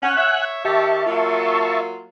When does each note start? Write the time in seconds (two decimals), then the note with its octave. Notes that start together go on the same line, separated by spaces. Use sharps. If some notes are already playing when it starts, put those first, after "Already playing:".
0.03 C#4 F#5 G#5 F#6
0.17 C#5 E5
0.65 D#3 G4 E5 A5 C#6
1.06 F#3 A#3 F4